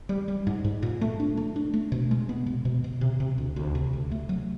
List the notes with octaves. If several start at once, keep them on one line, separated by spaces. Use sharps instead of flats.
G3
G3
G#2
G#2
A#2
A3
D4
A3
D4
A3
B2
G#3
B3
B2
B2
B2
C3
C3
D2
D2
C3
D2
A3
F#3